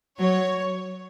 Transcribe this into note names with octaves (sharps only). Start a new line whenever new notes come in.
F#3 C#5